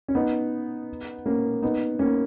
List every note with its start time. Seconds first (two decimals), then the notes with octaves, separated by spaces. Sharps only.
0.08 C#4
0.15 B3 D#4
1.26 A#3 C#4
1.62 B3 D#4
1.99 A#3 C#4